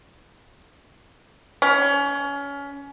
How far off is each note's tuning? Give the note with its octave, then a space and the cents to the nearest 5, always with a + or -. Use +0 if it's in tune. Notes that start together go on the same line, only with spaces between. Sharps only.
C#4 +25